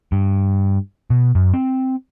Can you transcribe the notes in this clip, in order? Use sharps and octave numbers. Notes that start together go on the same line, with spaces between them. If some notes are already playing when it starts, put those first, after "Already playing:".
G2
B2
F#2
C4